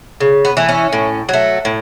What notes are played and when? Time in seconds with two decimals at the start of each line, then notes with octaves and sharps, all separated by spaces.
0.21 C#3
0.45 B3
0.57 E3 A3
0.69 C#4
0.92 A2
1.29 F#3 A3
1.65 A2